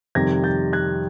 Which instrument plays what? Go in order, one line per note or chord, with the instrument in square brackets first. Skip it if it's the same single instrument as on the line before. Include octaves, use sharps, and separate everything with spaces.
[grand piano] F2 C3 D#3 G3 G#6 A#6
G6 A6
F#6 G#6